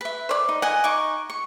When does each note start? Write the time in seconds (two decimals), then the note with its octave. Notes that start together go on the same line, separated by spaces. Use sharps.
0.01 B4 E5
0.29 C5 D5
0.49 D#4
0.62 D#5 F#5 G#5
0.84 D#4 C#6 D6
1.30 C#6